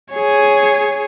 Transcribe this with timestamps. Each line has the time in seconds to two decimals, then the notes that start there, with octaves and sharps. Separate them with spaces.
0.14 G#4 C#5